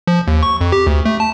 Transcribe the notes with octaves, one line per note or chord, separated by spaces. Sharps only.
F3
D#2
C#6
F2
G4
D2
A3
A5